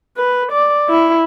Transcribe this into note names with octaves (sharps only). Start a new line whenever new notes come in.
B4
D5
E4